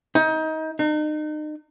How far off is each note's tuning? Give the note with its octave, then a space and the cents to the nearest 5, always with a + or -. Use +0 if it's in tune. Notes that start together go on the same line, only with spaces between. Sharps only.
D#4 +25
D#4 -35